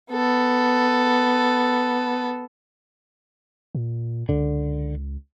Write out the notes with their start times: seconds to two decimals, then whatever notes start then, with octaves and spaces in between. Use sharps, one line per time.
0.11 B3 A4
3.75 A#2
4.29 C#2 D3